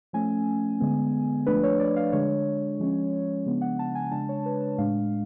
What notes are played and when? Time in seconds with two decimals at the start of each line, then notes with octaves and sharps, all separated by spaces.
0.13 F3 A3 C#4 G#5
0.80 D3 G#3 B3
1.46 F3 A3 D4 B4
1.63 C#5
1.80 D5
1.96 F5
2.12 D3 G#3 D4 C#5
2.80 F3 G#3 C#4
3.46 C#3 F3 G#3 B3 D4
3.61 F#5
3.79 A5
3.95 G#5
4.11 C#3 G#3 D4 A5
4.29 C#5
4.46 B4
4.78 A2 G#3 D4 F5